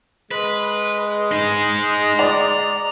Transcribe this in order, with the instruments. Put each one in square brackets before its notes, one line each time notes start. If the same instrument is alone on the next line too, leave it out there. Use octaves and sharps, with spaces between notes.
[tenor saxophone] G#3 [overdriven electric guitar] B4
[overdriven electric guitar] D#4 G#4
[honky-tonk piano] D5 [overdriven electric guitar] A#5